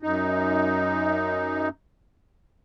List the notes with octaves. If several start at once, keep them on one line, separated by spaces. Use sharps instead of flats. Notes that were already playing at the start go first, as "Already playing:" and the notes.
F#2 D#4